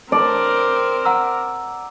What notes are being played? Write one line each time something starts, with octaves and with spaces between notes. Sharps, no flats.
C4 A#4 D5
F#5 A#5 E6